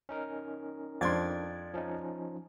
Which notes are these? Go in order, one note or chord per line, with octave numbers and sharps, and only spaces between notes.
C#4 D#4 A#4
F2 D4 D5 C6 G#6 A6
F3 C#4 D#4